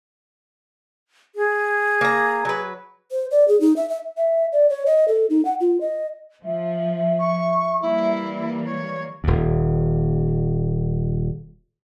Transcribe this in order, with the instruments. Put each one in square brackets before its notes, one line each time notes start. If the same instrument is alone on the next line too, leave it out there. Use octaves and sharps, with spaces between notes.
[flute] G#4
[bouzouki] A#3 A#5
F#3 B4
[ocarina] C5
D5
G#4
D#4
E5
E5
E5
D5
C#5
D#5
A4
D#4
F#5
F4
D#5
[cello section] F3 [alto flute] E5
[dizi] C#6
[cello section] E3 G3 A#3 [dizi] E4
[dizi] C#5
[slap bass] D#1 D#2